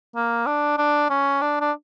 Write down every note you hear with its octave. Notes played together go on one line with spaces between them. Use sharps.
A#3
D4
D4
C#4
D4
D4